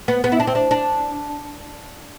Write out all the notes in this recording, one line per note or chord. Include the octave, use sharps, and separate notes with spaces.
B3
B3
E4
D4
C4
D4
D4